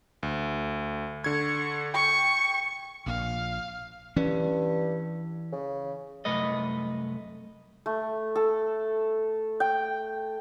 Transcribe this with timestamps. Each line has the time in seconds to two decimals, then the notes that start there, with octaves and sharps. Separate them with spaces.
0.23 D2
1.24 D3 C#6 G#6
1.94 G5 C#6
3.06 A#1 A#2 F5
4.16 G2 E3 C#4
5.52 C#3
6.25 C2 F#2 A3 B4 D#5
7.86 A3
8.36 A4
9.60 G5